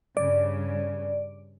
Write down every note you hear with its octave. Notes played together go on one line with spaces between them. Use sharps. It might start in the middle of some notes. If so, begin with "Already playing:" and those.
G2 C#3 D5